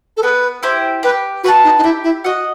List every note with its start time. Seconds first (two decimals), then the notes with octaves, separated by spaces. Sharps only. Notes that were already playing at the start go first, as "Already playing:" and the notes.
0.17 A4
0.23 B3 B4
0.63 E4 G4 C5
1.03 G4 B4
1.44 F#4 B4 F#5 A5
1.64 D#4
1.78 D#4
1.84 E4 G4
2.04 E4
2.24 F#4 D#5 F#5